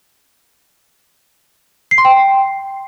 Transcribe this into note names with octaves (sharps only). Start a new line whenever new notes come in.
C7
C6
G5